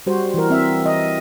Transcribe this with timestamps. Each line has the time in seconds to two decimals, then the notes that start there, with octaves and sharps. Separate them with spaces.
0.07 G3 F#4 C5
0.34 E3 A#4
0.50 C4 E5
0.86 D#5